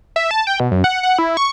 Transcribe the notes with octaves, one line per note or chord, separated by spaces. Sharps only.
E5
A5
G5
B2
F#2
F#5
F#5
E4
C#6